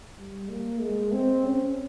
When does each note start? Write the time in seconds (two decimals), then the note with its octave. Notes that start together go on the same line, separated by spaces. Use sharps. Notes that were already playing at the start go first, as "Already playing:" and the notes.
0.18 G3
0.49 A#3
0.80 G#3
1.12 C4
1.44 C#4